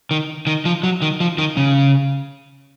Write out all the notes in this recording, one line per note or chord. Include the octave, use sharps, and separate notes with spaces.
D#3
D#3
F3
F#3
D#3
F3
D#3
C#3